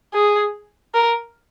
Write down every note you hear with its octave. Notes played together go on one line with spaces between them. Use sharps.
G#4
A#4